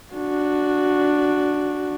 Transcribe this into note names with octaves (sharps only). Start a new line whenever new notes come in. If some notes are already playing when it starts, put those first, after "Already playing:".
D4 F#4